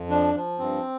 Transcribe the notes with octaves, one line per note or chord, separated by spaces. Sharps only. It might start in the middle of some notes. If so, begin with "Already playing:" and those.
Already playing: F2
F3 D4
F3
G2 C4